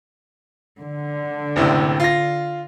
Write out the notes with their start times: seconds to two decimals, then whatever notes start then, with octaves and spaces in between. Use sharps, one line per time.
0.80 D3
1.56 F#1 A2 C3
2.00 F4 A#6